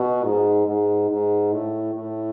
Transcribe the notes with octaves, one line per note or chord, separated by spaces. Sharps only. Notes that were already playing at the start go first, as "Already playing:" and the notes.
Already playing: B2
G#2
G#2
G#2
A2
A2